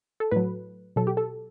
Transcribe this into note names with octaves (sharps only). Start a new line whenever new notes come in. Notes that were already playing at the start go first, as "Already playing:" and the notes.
A4
A2 F#3 B4
B2 F#3 A4
G4
A4